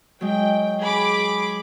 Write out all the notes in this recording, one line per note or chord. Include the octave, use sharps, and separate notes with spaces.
F#3 G#3 G5
G#4 B5 D6